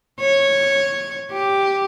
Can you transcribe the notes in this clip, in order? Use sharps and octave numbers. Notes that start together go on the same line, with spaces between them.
C#5
G4